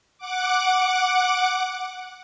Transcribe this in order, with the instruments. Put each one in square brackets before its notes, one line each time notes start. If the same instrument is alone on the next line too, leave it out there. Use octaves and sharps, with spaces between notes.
[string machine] F#5 D6